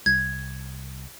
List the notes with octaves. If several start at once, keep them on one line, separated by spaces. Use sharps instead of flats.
C2 G#6